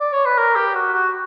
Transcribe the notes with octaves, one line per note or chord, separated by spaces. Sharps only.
D5
C#5
B4
A#4
G4
F#4
F#4